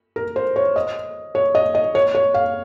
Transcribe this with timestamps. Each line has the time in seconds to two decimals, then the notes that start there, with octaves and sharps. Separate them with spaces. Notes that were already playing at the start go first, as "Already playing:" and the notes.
0.16 A#4
0.36 C5
0.56 C#5
0.76 D#5
1.35 C#5
1.55 D#5
1.75 D#5
1.95 C#5
2.15 C#5
2.34 F5